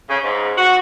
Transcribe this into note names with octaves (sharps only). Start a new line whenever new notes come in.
C#3
G#2
F#4